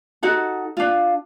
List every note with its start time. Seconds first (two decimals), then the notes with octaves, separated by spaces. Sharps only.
0.23 D#4 F#4 A4
0.77 D4 F4